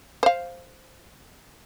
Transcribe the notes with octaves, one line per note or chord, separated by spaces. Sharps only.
C5 F5